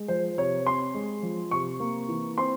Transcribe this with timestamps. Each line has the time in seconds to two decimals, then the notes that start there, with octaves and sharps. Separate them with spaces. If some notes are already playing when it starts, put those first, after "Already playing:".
Already playing: G#3
0.08 F3 C5
0.38 C3 C#5
0.65 C4 C6
0.94 G#3
1.23 F3
1.51 C3 C#6
1.80 A#3
2.08 E3
2.38 C4 C6